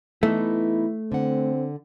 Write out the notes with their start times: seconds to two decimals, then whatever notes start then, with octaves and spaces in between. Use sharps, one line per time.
0.23 E3 A3 B3 D#4 E4
1.12 D3 C4 F#5